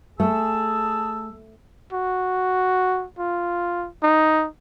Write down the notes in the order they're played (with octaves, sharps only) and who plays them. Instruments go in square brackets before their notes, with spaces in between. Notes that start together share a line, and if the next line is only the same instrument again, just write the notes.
[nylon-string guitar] A3 [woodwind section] G#4 A5 E6
[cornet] F#4
F4
D#4